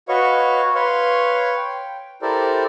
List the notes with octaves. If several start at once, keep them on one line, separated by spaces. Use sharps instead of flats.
F#4 B4 C#5 D#5 F5 C#6
B4 C#5 F5 C6
G5
E4 G4 A4 A#4 C5 D5